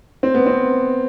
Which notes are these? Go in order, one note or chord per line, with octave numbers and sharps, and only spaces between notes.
C4
B3
C4